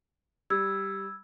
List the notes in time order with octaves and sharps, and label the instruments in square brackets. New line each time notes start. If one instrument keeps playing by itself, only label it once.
[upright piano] G3 [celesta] E6 G#6